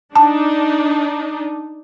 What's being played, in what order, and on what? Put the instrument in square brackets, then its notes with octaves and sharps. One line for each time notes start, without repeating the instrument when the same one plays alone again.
[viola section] D4 D#4 [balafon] A5